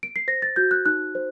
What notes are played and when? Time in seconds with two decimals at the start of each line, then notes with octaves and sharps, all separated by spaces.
0.03 D7
0.16 C7
0.28 C5 A#6
0.42 A6
0.56 F#4 G6
0.71 F#6
0.86 D#4 F#6
1.15 C5